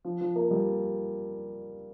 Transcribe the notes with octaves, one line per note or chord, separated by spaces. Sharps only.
F3
F3
A#3
G3